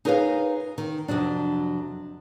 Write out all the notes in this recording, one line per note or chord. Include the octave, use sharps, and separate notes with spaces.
D#4 G#4 A#4 B4 C#5 F5
D#3
F2 C3 F#3 D4